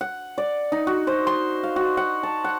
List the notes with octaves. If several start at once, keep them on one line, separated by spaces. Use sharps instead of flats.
F#5
D5
D#4
F#4
C5
C6
F5
F#4
F#5
A5
F#5